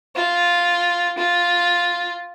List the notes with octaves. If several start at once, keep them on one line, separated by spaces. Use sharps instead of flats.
F4
F4